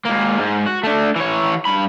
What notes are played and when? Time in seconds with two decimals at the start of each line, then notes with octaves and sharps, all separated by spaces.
0.05 G#2 A#3
0.39 G#2
0.66 F#4
0.83 A3 D4
1.16 E3 C#5
1.65 G2 B5